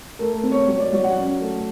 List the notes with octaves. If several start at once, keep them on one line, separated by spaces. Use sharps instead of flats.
A3 A#4
C4
C#5
F#3 C#5
D5
F#3 C#5
F#5
C#4
A3